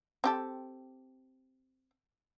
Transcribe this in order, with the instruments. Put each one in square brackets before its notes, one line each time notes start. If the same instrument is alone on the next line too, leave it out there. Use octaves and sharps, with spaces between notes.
[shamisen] C4 G4 A4